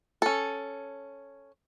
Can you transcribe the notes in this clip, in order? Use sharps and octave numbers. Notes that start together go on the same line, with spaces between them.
C#4 A4